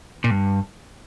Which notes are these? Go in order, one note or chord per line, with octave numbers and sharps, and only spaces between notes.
A#2
G2